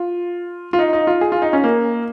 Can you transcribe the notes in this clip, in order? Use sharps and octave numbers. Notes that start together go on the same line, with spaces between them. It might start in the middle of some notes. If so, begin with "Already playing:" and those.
Already playing: F4
F4
D#4
D#4
F4
G#4
F4
D#4
C#4
A#3